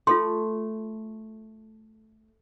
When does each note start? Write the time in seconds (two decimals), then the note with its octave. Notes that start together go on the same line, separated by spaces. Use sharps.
0.07 A3 F4 A4 C6